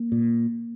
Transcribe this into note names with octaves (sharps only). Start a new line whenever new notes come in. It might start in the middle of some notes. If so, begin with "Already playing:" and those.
Already playing: A#3
A#2